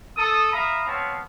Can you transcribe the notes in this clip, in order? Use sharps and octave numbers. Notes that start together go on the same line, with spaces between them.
A4 D#6
E5 F5 A#5 B5 D#6
B3 C4 C#5 F5 A5